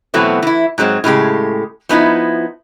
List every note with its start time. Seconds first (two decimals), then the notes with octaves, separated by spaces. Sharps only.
0.14 B2 E3 F#3 A3 B3 C4
0.42 E3 E4
0.78 G#2 F#3 G#3 C4
1.04 A2 C#3 G#3 G4
1.89 F3 B3 D#4 E4